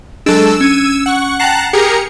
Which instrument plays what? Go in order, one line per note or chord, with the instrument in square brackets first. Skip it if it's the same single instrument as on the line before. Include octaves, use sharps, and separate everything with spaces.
[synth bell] F#3 D4 [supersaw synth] G#3 A4 [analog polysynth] E6
[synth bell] C#4 [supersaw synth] G#6 D#7
[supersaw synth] F#5 C#6
[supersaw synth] F#5 A5 A#5 [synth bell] G5 C7 [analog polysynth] F#6
[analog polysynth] G4 G#4 A#4 [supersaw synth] A#5 C#7